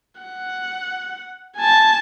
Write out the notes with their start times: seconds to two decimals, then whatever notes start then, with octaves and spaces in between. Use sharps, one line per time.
0.21 F#5
1.57 G#5 A5